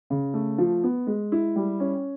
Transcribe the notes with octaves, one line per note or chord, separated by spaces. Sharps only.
C#3
A3
F3
B3
G#3
E4
G3
C#4